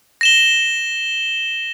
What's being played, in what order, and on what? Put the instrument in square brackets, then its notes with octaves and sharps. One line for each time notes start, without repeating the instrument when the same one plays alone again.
[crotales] A#6 E7 G7